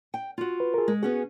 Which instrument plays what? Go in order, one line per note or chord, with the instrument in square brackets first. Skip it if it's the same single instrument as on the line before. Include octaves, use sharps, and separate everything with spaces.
[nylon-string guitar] G5
F4 F#4
[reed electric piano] B4
G#4 A#4
[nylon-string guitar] G#3
[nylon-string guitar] B3 C#4 F#4 [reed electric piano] G#4